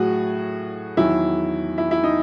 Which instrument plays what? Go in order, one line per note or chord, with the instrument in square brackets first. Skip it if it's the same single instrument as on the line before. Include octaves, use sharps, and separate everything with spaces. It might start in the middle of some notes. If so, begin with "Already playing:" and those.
Already playing: [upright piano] A2 F#3 F#4 G#4
E2 D#3 F#3 E4
E4
E4
D#4